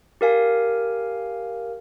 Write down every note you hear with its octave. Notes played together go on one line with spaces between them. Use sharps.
G4 A#4 F5 G#5